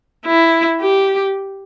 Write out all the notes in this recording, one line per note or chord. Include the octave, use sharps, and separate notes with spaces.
E4
G4